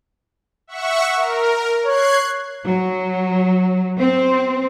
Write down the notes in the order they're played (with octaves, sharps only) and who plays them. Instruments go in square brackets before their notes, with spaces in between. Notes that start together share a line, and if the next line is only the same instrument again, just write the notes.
[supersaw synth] E5 F#5 C#6
A#4
[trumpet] C#5 [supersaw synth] F#6 G#6 C7
[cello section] F#3
C4